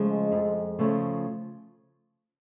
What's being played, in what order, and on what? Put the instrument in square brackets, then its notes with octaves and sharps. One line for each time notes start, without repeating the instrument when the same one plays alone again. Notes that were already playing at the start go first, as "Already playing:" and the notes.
Already playing: [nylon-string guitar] C#3 F3 A3 C#4 [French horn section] G#3
[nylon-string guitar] F2
C#3 F3 A3 C#4